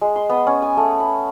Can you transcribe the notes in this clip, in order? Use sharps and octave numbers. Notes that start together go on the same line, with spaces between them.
G#3
C6
B3
C#4
G#5
A3
B5